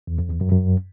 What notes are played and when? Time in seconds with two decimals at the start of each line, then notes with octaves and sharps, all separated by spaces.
0.07 E2
0.19 F2
0.30 E2
0.41 F#2
0.52 F#2